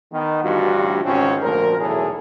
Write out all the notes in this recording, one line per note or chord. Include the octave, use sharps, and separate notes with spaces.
D#3 B3
A1 D2 G2 G3 F4 F#4
G#1 C#2 G#2 C4 C#4
D2 A#2 F3 A#4
B1 E2 A2 G#4 A4